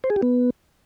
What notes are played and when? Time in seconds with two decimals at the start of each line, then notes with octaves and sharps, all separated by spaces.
0.04 C5
0.10 G#4
0.16 G4
0.22 B3